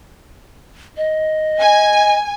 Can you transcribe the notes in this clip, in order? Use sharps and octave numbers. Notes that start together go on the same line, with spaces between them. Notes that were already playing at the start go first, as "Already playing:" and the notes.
D#5
G#5